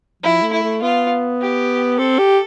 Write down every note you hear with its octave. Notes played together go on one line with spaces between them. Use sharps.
F3 E4
A3
E4
A3
B3 F4
G4
C4 A4
G4